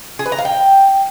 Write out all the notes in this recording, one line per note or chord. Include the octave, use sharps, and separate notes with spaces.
G#4
B4
A#5
F5
G5